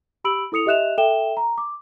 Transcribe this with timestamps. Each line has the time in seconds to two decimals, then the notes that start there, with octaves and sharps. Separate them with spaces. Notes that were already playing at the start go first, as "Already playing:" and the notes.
0.24 G4 B5 E6 D7 F#7
0.52 E4 A4 D#6 C#7 F7
0.66 G4 D#5 E5 F#6 E7 F7
0.98 A4 E5 G5 E7 G7
1.37 A#5
1.58 D6